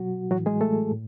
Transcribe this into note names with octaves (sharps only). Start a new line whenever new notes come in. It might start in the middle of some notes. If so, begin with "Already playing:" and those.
Already playing: B2 F#3 F#4
A2 E3 F#3 F#4
G#3 G#4
A3 A4
A2